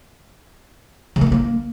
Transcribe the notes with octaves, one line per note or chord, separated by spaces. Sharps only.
C#3
A#3
A3
A#3